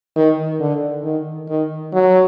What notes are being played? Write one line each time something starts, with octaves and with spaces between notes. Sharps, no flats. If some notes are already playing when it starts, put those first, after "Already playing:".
D#3
D3
D#3
D#3
F#3